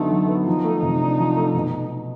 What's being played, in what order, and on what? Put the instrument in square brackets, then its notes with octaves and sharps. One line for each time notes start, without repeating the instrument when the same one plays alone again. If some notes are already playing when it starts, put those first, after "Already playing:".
Already playing: [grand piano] D3 F#3 B3 D#4 [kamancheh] A3
[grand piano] F#3
B3
[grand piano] F3 [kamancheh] D#4
[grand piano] A3
C3
D4
F3
A3
B2